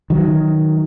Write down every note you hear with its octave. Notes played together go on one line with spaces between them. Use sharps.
D#3 F#3